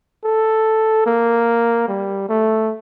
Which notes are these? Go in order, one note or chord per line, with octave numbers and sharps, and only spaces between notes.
A4
A#3
G3
A3